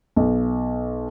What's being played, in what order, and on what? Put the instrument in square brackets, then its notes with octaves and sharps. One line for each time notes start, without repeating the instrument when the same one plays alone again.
[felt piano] B1